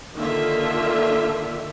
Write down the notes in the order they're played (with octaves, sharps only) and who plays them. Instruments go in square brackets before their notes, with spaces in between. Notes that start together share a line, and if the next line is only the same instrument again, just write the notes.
[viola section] D3 D#3 A#3 F4 E5